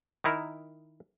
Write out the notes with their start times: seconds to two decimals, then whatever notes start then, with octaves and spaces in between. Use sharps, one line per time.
0.24 D#3 D#4 E4 A#4